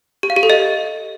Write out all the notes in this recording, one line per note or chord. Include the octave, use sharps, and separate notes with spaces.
G4
F5
G4
A4
D#5